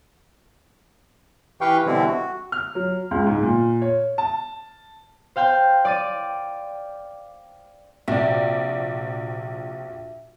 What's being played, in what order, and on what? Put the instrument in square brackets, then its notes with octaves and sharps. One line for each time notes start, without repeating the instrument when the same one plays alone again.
[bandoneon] E3 G4 B4 F5 G5 C#6
B2 D3 E3 G3 C4 E4
F#4
[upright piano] F6
F#3
C#2
G#2
A#2
C#5
A5
[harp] C5 F5 G5 C6
D5 D6 A6 D#7
[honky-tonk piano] A#1 D5 [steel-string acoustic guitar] C3 [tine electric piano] F#4 [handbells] E5